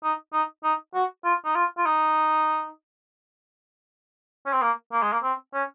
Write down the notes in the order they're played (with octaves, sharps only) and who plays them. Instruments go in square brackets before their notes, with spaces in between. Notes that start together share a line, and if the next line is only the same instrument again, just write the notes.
[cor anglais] D#4
D#4
D#4
F#4
F4
D#4
F4
F4
D#4
C#4
C4
A#3
A#3
G#3
A#3
C4
C#4